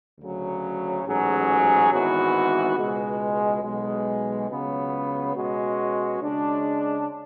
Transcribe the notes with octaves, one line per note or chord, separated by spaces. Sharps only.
D2 C#3 F#3
A1 G#2 F#3 C#4 G#4
G#1 G#2 E3 B3 F#4
C#2 B2 G#3
B1 B2 G#3
C#2 C#3 F#3 B3
B2 G#3 C#4 F#4
C#3 G#3 D4